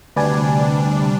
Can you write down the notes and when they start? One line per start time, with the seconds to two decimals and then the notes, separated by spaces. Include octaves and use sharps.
0.16 D2 C3 G3 D4 B4 D5 G#5